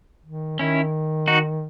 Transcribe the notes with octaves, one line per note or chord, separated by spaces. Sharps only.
D#3
D#3 C#4 E4
D#4 F#4